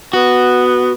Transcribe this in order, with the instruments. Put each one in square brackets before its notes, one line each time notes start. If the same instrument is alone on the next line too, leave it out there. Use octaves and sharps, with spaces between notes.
[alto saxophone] B3 [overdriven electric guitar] F#4